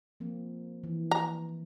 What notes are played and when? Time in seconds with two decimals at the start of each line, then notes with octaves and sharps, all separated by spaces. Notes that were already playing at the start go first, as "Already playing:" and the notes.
0.20 F3 A#3 C4
0.83 E3
1.11 A#5